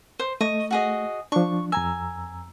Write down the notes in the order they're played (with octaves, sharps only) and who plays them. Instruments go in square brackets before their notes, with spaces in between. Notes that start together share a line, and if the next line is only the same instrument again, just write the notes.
[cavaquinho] C5
[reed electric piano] A3 [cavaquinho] D#5 C#6
[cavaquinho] F#4 G#4 D#5
[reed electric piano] F3 D4 [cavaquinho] C#6
[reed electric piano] F2 A#5 E6 [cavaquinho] G#5